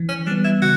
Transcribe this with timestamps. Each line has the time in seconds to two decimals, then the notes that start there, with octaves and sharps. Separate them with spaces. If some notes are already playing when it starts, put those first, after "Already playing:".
Already playing: E3
0.09 C#4
0.27 G3 B3 D4
0.44 E4
0.62 C#3 F#4